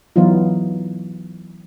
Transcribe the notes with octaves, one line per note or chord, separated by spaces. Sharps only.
E3 F#3 B3 D#4 F4